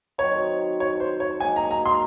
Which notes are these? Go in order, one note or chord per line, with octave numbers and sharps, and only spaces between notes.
D#3 F#3 C4 C#5
C#5
C5
C#5
G#2 F#3 A#3 D#4 G#5
A#5
A#5
C6